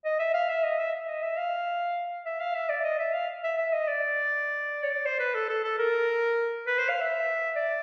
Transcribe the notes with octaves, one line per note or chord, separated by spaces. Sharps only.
D#5
E5
F5
E5
D#5
E5
D#5
E5
F5
E5
F5
E5
D5
D#5
E5
F5
E5
E5
D#5
D5
C#5
D5
C5
B4
A4
A4
A4
A#4
B4
C5
F5
E5
D5